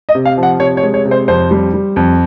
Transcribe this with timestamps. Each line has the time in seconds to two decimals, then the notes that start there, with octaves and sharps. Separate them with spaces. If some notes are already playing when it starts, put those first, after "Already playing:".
0.09 D#5
0.15 C3
0.25 F5
0.37 F3
0.43 F#5
0.60 C3 C#5
0.77 C#5
0.82 G#3
0.94 C#5
1.05 C3
1.11 C5
1.28 F2 C5
1.51 G3
1.74 G3
1.96 F2